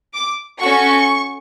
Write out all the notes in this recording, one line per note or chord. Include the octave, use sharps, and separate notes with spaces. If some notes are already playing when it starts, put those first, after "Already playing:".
D6
C#4 F#4 A4 C#6